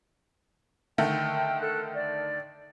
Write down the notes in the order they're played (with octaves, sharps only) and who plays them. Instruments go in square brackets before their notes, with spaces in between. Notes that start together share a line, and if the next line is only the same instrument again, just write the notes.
[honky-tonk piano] D3 D#3 A3 [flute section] G5
[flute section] A4 F#6
D5